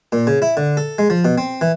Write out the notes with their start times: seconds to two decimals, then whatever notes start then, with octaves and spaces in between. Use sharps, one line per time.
0.12 A#2
0.27 C#3
0.42 E4
0.57 D3
0.77 A4
0.98 G#3
1.10 F3
1.25 B2
1.38 C4
1.61 E3